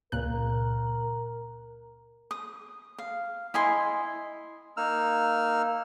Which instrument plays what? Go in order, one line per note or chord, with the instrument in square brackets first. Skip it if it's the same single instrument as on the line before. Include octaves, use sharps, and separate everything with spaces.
[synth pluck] C#2 A#2 F#6 [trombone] A#4
[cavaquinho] D#6
F5
E4 D#5 G#5 C6
[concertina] A#3 D#4 E6 F6